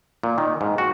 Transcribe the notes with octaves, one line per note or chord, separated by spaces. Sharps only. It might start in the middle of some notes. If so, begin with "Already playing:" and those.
A#2
D#3
G#2
F#4